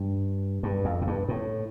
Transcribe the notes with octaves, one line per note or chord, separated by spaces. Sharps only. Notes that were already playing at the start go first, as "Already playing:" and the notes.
Already playing: G2
G2
F2
A2
G2
A2